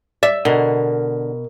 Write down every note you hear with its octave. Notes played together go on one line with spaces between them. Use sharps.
D5 E5
B2 D3 A#4